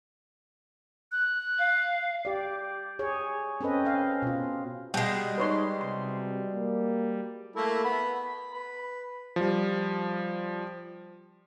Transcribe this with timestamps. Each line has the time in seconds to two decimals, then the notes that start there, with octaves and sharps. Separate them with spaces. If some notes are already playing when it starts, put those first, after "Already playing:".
1.12 F#6
1.59 F5
2.25 G4 D5
2.99 G#4 C#5
3.61 C4 C#4 A4 B4 D#5
3.85 C#4 F5
4.22 B2 F4
4.94 B2 G3 G#3 G5
5.38 D#4 B4 C#5 C6
5.81 C3 C6
6.54 A#3
7.56 A3 A#3 E4
7.84 B3 B5
8.22 B5
8.54 B4
9.36 F3 G3